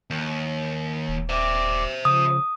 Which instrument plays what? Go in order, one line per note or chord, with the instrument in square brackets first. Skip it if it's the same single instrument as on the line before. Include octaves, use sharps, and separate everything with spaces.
[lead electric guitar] D#2
[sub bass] D#1
[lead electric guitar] C5 E5 [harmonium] D5
[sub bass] C#3 [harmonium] F3 [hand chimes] D#6